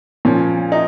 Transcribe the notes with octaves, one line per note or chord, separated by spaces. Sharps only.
A#2 F3 C#4
D#4